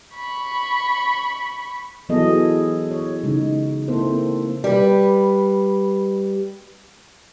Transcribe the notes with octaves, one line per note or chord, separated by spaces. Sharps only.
B5 C#6
E3 F#3 B3 G#4 A4 D#5
G#4
C#5
C#3 G#3 D#4
A#3 C4 E4 A4 C5
G3 B4